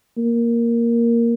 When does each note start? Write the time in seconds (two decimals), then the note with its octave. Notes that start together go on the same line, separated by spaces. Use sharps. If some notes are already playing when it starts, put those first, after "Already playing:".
0.17 A#3